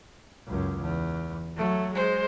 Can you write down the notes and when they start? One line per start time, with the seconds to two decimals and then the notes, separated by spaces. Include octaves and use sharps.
0.47 C#2 F#2
0.81 E2
1.57 F#3 A3
1.94 G#3 C5